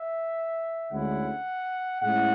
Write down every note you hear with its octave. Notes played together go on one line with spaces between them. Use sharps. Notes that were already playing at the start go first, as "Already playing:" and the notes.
Already playing: E5
D2 D3 G#3 C#4 E4 F#5
A2 G#3 C#4 E4 F#5